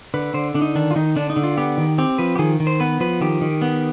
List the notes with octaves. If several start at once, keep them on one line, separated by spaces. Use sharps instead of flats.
D3 B4
D3 C5
D3 D4
D#4
D#3 D4
F4
D#3 D#4
D3 D4
D#4
D3
F4
B3 G4
D#3
C4 G4
F3 B4
G4
D#3 G#4
D#3
C5
B3 B4
F3 B4
D#3 G4
D#3
B3